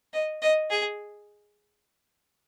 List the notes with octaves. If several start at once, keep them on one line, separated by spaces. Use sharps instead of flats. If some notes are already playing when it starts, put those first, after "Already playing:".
D#5
D#5
G#4